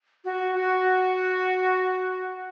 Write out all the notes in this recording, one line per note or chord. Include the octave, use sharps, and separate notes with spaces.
F#4
F#4